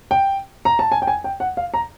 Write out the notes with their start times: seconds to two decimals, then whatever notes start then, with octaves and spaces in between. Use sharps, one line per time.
0.11 G5
0.65 A#5
0.79 A5
0.92 G#5
1.02 G5
1.07 G#5
1.24 G5
1.40 F#5
1.57 F5
1.74 A#5